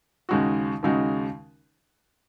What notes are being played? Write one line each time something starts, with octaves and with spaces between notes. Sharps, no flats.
D#2 C#3 G#3 D#4 F#4
D#2 C#3 G#3 D#4 F#4